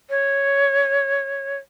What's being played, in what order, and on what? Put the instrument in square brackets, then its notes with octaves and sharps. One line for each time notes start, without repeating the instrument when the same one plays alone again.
[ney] C#5